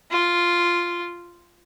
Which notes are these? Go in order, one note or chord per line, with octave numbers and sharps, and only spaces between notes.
F4